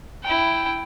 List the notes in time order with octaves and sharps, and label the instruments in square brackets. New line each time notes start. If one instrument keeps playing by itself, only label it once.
[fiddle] E4 G5